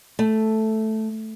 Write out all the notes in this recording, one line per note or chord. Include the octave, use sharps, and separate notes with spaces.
A3